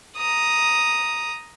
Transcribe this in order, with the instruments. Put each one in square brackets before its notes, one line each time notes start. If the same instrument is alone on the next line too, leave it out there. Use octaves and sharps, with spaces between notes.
[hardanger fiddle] A#5 D#6